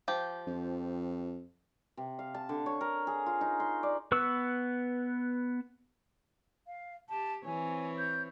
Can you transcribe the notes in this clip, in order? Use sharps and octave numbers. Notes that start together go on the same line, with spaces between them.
F3 G4
F2
C3
F5
A5
D3
C#5
A#4
G#4
F4
D#4
C6
D5
B3 B4 C#6 E6
F5
G4 A5
E3 C4 C#5 G#5
G6